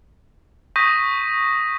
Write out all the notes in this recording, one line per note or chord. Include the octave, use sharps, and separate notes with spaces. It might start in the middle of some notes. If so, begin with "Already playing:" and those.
C#6 D#6 G6 A#6 B6 D#7